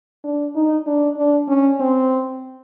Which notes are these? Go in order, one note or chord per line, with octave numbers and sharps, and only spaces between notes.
D4
D#4
D4
D4
C#4
C4